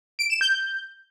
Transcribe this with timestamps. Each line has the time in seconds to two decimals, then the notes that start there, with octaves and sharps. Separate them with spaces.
0.19 D7
0.30 E7
0.41 G6